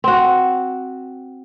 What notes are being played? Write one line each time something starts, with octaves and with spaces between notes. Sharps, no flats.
C4 F#4